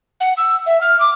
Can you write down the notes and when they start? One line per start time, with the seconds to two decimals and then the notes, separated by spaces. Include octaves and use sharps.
0.21 F#5
0.37 E6
0.66 E5
0.81 F6
1.00 D6